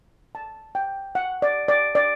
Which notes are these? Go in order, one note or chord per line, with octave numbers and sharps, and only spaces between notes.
A5
G5
F#5
D5
D5
D5